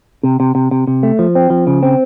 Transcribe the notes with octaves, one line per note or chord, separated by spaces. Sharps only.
C3
C3
C3
C3
C3
A3
F3
C4
F3
C#3
C4